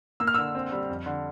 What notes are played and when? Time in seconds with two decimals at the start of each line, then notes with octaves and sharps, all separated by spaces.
0.20 A#3 E6
0.27 F6
0.34 D3 E6
0.55 C4
0.72 G3
0.89 F2
1.06 D3